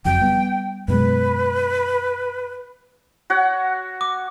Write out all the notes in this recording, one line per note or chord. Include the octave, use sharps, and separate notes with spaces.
F#1 F2 F#3 G5
G3 B3
F#2 B2 G#3 B4
F#4 C#5 F#5
D6